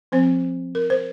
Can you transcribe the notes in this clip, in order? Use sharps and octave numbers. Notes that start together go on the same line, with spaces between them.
F3 C4 C5
A#4
C5